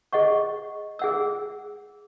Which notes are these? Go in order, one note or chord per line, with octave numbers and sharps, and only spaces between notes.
G#4 D#5 F#5 C#6
G#4 F#5 E6